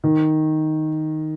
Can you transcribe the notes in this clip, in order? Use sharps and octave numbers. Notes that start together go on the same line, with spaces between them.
D#3